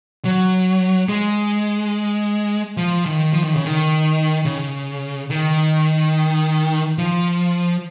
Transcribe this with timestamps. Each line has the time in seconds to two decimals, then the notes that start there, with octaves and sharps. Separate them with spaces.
0.25 F#3
1.09 G#3
2.77 F3
3.06 D#3
3.33 F3
3.44 D#3
3.53 C#3
3.65 D#3
4.45 C#3
5.30 D#3
6.98 F3